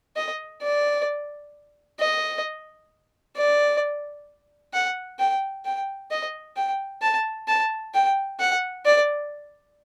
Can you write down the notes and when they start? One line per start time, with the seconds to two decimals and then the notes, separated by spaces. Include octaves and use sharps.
0.16 D#5
0.62 D5
1.99 D#5
3.37 D5
4.73 F#5
5.19 G5
5.65 G5
6.11 D#5
6.56 G5
7.02 A5
7.48 A5
7.94 G5
8.40 F#5
8.85 D5